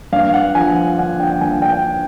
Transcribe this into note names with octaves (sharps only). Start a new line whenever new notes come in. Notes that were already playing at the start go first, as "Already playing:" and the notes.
G2 F5
F#5
F3 G#5
D3 F#5
G5
G2 G#5
G5